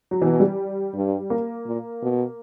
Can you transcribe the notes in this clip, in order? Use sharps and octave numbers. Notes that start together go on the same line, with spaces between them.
F#3
B2 E3
G3
G2
A#3
A#2
B2